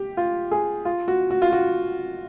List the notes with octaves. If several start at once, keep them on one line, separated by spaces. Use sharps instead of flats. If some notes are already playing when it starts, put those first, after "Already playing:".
Already playing: G4
F4
G#4
F4
F#4
F#4
F4
F#4